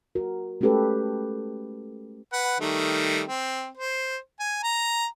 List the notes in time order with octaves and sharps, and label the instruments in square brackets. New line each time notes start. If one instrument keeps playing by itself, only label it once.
[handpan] F#4 A#4
G#3 A3 C#4 G4 A4 B4
[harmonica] B4 F#5
D#3 G3 A3
C4
C5
G#5
A#5